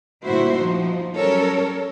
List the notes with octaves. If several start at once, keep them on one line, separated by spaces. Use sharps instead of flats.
D2 G2 A#2 E4 F#4 C5
F3 D#4
F#3 G3 C#4 A4 A#4 C#5